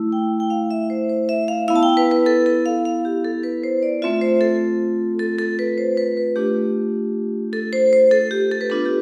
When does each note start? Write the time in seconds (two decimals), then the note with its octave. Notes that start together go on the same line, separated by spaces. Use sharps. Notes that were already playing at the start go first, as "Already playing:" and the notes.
Already playing: A3 E4
0.12 G5
0.40 G5
0.50 F5
0.71 E5
0.90 C5
1.09 C5
1.29 E5
1.48 F5
1.68 B3 E4 F5
1.76 A5
1.83 G5
1.97 B4
2.11 B4
2.26 A4
2.46 A4
2.66 F5
2.85 F5
3.05 G4
3.25 A4
3.43 B4
3.64 C5
3.82 D5
4.02 A3 C4 F4 E5
4.21 C5
4.41 A4
5.19 A4
5.39 A4
5.59 B4
5.78 C5
5.97 B4
6.17 B4
6.36 A3 D4 F4 G4
7.53 A4
7.73 C5
7.93 C5
8.11 A4
8.31 G4
8.51 A4
8.61 B4
8.70 B3 D4 F4 A4
8.85 G4